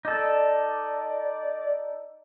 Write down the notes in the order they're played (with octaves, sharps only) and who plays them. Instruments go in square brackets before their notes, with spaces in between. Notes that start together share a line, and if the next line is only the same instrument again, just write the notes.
[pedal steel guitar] D#4 A4 [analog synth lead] D5